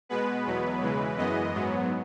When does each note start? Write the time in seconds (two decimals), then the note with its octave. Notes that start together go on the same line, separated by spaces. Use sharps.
0.09 B2 G#3 B3 B4
0.46 E2 B2 F#3 B3
0.82 C#3 E3 G#3
1.17 F#2 E3 G#3 B3 D#5
1.54 G#2 F#3 B3